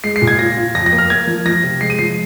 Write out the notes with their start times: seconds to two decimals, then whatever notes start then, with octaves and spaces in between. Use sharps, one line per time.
0.04 G#3 C7
0.16 C7
0.22 A#2
0.27 G#6
0.39 F4 A#6
0.57 F4
0.75 F2 A#6
0.86 A#6
0.92 A#3
0.98 F6
1.10 A#3 G#6
1.27 F3
1.45 F3 A#6
1.63 C3
1.81 G#3 C7
1.90 D#7
1.99 F3 C7